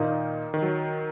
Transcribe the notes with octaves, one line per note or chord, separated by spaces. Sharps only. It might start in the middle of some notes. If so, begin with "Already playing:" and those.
Already playing: A#2 D#3 A#3 D#4 A#4
D#3
F#3